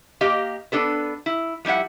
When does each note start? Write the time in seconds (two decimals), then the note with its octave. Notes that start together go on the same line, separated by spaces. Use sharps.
0.21 A#3 G4 D#5 F5
0.72 B3 D4 A4 B4
1.26 E4
1.65 F3 G3 E4 E5 F#5